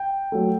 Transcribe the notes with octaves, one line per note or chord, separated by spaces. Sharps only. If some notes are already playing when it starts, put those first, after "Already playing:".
Already playing: G5
F#3 A3